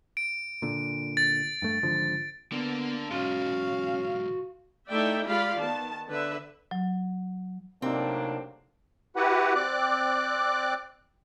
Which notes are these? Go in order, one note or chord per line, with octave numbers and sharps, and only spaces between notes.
D7
A#2 D3
A6
G2 A3
G#1 D3 F3
D3 A#3 B3 D4
B1 G#2 C#4 F#4 F5 C6
A3 D#4 E4 D5 E5 G5
G#3 F4 G4 D5 F5 B5
D#3 B3 A5
D3 D4 B4 E5
F#3
A2 C3 F#3 A#3 C4 D4 D#4
E4 F#4 G4 B4 F#5
C4 D5 D6 F#6